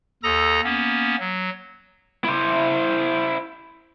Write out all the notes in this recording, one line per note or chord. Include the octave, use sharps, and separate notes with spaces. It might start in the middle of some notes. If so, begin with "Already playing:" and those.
D#2 A4 A#5 D#6 A#6
A#3 B3 C#4
F#3
E4 C5